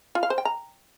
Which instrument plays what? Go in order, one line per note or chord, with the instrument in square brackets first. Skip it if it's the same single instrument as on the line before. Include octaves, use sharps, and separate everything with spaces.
[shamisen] F4
F5
C5
G5
A#5